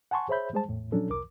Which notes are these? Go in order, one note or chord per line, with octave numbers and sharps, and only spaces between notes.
F#5 G#5 A5 C6 C#6
G#4 C5 C#5 E5 B5 G6
G3 G#3 G#4 C5 A5
E2 A2
A#2 F3 F#3 C#4 D4 A4
C2 F2 A#4 D6